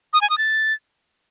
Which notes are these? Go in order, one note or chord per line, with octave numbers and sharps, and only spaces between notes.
D#6
G#5
D#6
A6